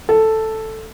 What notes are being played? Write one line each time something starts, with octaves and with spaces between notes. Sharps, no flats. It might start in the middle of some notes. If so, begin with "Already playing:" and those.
A4